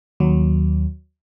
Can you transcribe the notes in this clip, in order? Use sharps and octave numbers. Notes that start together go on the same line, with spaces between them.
D#2 F#3